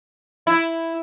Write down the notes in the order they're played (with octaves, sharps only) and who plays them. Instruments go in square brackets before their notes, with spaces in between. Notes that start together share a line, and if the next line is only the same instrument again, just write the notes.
[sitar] E4